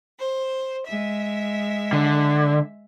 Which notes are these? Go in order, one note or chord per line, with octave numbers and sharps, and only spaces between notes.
C5
G#3 E5
D3